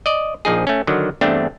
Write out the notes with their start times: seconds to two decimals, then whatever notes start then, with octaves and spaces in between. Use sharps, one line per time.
0.06 D5 D#5
0.45 A#1 F3 D#4 G#4
0.67 A3 C#4
0.87 D3 D#3 F#3
1.21 E2 G2 A3 C4 D4